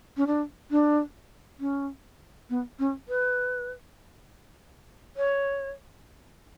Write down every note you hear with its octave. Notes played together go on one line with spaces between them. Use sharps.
C#4
D4
D4
C#4
B3
C#4
B4
C#5